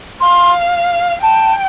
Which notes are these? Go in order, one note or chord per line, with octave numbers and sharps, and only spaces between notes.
F5 C6
G5 A5